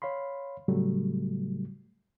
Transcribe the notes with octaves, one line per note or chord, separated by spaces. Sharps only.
C#5 F5 B5 C6
A2 C#3 F#3 G3 A3